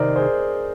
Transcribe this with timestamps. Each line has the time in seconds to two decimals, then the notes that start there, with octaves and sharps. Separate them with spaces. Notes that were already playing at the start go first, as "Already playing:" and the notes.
Already playing: C3 D#3 A#4 C5 D5 D#5
0.16 G#4 C5